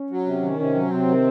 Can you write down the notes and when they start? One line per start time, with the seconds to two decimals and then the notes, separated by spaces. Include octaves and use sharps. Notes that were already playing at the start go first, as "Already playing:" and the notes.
Already playing: C#4
0.10 F#3
0.26 C3
0.42 D#3
0.59 C3 C#4
0.75 F#3
0.91 C3 C4
1.08 D#3